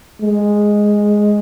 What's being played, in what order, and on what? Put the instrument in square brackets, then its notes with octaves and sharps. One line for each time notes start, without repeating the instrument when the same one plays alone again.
[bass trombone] G#3